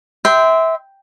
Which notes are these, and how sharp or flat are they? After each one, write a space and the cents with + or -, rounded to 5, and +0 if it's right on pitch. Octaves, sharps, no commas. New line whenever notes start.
E5 -20 G5 +0 C6 -20